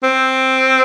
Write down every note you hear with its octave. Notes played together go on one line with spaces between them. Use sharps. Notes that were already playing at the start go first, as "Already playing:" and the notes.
C4